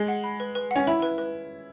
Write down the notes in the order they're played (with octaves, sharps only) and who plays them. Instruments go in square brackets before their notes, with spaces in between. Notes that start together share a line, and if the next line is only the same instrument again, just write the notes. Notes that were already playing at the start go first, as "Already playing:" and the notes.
Already playing: [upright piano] G#3
[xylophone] F#5
B5
B4
B4
[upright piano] C#4 [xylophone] F#5
[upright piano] E4 [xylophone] B5
[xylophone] B4
B4